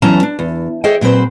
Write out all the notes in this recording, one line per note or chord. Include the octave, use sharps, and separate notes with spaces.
E2 E3 F#3 C#4 A5 A#5
D4
E2
G#4 A4 C5 C#5 D#5 G5
A#2 F#3 C4 B4 C5